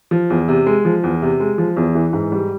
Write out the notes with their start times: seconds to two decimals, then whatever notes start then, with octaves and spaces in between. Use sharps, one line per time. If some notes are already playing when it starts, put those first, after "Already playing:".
0.11 F3
0.30 E2
0.48 C3
0.67 G#3
0.85 F3
1.04 E2
1.22 C3
1.40 G#3
1.58 F3
1.77 E2
1.95 E3
2.13 G#2
2.32 G3